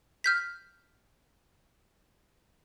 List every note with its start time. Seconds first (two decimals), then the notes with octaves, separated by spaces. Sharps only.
0.24 F6 G6 B6